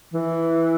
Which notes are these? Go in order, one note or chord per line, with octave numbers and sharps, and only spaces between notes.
E3